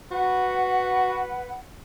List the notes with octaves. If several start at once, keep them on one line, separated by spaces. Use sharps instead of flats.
F#4 B4 F#5